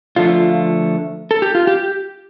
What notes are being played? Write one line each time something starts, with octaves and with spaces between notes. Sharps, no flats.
D3 F3 A3 F4
A4
G4
F4
G4